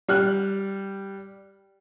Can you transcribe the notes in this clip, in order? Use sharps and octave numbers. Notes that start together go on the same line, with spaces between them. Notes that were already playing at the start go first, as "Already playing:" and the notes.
G3 F6 F#6